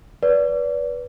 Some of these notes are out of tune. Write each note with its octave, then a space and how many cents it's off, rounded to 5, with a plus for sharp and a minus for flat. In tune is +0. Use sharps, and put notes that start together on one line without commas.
B4 -10 D5 -30